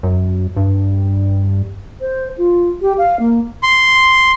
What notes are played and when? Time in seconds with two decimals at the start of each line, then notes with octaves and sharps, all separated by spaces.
0.03 F#2
0.57 G2
2.01 C5
2.38 F4
2.82 G4
2.98 F5
3.20 A#3
3.63 C6